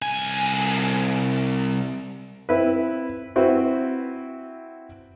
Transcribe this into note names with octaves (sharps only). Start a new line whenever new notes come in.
C2 G#5
C4 E4 B4
C4 E4 F#4 B4